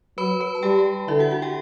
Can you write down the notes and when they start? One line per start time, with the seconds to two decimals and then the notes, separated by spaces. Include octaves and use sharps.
0.18 F#3 B4 B5
0.40 B4 B5
0.55 A5
0.63 G3 G4 G5
1.08 D3 E4 E5
1.19 F#4 F#5
1.31 F#4 F#5
1.42 G4 G5